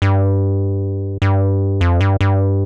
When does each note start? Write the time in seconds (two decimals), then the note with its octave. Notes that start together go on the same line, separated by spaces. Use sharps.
0.02 G2
1.22 G2
1.81 F2
2.01 G2
2.21 G2